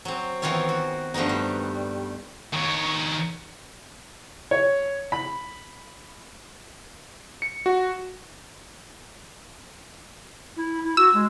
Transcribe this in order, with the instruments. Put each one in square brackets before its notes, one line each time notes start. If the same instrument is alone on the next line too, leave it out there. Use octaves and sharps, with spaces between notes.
[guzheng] F#3 C4
D#3 E3 B3 C4 F4 C#5
F#4
G2 F3 A3 B3 D#4
G3
[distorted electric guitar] D#3 C#5
[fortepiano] C#5
B5
[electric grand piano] C#7
F#4
[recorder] E4
E4
[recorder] F#4 [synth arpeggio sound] E6
[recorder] G#3